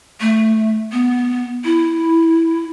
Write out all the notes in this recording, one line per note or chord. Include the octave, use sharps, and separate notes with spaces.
A3
B3
E4